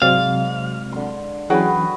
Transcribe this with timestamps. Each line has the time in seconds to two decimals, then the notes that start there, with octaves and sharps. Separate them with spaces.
0.02 G#2 C3 F#3 C4 D5 F5
0.92 D3 C6
1.50 E3 F#3 C#4 F#4 G#4 B4 F#5 G5